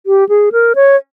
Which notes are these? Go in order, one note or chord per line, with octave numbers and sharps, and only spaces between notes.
G4
G#4
A#4
C#5